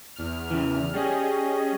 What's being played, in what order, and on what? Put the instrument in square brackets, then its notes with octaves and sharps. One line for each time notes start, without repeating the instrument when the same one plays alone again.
[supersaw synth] E2 F6
[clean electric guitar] C#3 E3
[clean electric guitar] G3 [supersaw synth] C#4 G#4 D#5